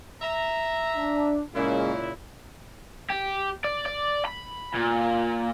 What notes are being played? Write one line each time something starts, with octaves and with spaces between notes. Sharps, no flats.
E5 A#5
D4
A#2 C#3 G#3 A#3 C#4 E4
G4
D5
D5
B5
A#2